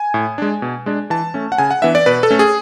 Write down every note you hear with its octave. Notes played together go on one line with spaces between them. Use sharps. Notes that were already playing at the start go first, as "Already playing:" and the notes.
Already playing: G#5
A2
G#3 D4
B2
G#3 D4
E3 A5
A3 C#4
F#5
C#3 G#5
F#5
E3 B3 D4 E5
D5
B2 B4
A4
A3 C#4
G#4